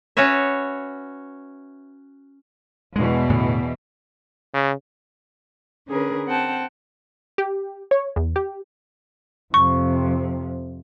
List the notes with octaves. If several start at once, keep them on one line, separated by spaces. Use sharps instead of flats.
C#4 F#4 B4 C#5 E5
E2 B2 E3 G#3
A2 D3 B3
C#3
D3 C#4 G#4 A#4 B4
C4 F#5 G5 A5
G4
C#5
E2
G4
F2 C3 C#6